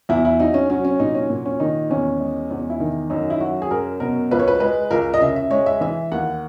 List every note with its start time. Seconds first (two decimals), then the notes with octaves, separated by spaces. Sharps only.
0.09 E2 E4
0.25 E4
0.39 F#3 D#4
0.54 C#4
0.70 F#3 C#4
0.84 C#4
1.00 A#2 D#4
1.15 C#4
1.30 A#2
1.46 C#4
1.60 D#3 D#4
1.90 E2 C#4
2.20 G#3
2.51 E2
2.70 E4
2.80 D#3 D#4
3.10 F#2 D#4
3.30 E4
3.40 F#3 F#4
3.62 G#4
3.71 F#2 A#4
4.00 B2 A#4
4.31 C#2 B4
4.40 C#5
4.48 B4
4.60 G#3 B4
4.91 C#2 A#4
5.14 D#5
5.21 C#3 E5
5.36 E5
5.51 G#3 C#5
5.66 E5
5.81 E3 E5
6.12 D#2 F#5